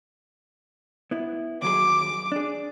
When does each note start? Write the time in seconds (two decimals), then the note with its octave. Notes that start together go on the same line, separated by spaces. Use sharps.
1.11 B3 E4
1.62 D#2 F#3 G#4 D6
2.32 D4 G#4